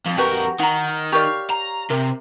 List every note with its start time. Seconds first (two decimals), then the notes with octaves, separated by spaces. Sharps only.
0.06 F2
0.18 F2 F#4 G4 A#4 B4
0.60 D#3 F#5 A#5
1.12 G4 A#4 C#5 D5 F5
1.50 A#5
1.90 C3 A#4